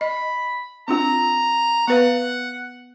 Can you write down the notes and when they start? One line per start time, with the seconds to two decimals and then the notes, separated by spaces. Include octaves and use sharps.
0.01 D#5 B5
0.88 C4 D4 F4 A#5
1.88 B3 B4 F5 F#5